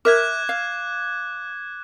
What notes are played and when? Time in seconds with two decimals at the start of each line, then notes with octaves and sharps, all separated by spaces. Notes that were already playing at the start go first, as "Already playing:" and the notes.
0.05 A#4 E5 D6 F#6 G#6
0.49 F5